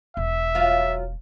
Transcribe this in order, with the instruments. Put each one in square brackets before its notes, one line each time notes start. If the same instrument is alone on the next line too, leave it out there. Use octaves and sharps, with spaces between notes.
[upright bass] E1 [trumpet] E5
[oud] F#3 F4 F5